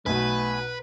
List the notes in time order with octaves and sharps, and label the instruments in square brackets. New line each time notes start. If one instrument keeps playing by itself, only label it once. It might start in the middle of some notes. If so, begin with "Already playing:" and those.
[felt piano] B1 B2 [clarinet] A3 [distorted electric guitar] B4 [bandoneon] G#5 B5